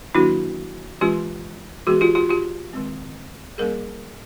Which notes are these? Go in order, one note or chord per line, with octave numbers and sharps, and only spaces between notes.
D#3 F#3 A#3 D4 E4 F#4
E3 G#3 C#4 F4 G4
E3 G#3 B3 F#4 G#4
F4 G4
F4 G4
F4 G4
D#3 G#3 C4
G3 A#3 C#4 G#4 A#4